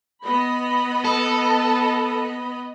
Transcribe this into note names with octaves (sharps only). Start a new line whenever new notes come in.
B3 D#5 B5
A4